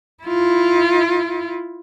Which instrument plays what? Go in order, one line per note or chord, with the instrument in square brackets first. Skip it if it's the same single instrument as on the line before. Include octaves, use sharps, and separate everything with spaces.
[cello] E4 F4